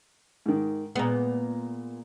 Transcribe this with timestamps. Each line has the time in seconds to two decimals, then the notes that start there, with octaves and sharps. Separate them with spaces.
0.46 G#2 D#3
0.96 A#2 G#3 B3 A#5